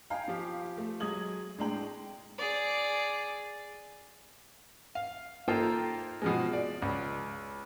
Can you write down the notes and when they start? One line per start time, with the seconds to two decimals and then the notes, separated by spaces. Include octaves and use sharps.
0.10 D#4 F5 G5 G#5
0.28 F3 G4
0.78 A3
1.00 F#3 G#3 D#6 G#6 F#7
1.58 A2 G#3 D4 G5 F#7
2.38 G#4 D5
4.95 F5
5.48 A#3 D#4 F4 A4 C5 G5
6.22 B2 F3 G#3
6.53 D5
6.82 C#2